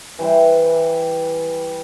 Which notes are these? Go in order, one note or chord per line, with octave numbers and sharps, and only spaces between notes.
E3 G3 C5